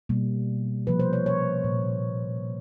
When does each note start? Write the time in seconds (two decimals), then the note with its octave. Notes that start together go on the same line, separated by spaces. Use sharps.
0.09 B2 G3 A#3
0.87 C3 F3 A#3 B4
1.00 C5
1.13 C#5
1.26 C#5
1.64 A#2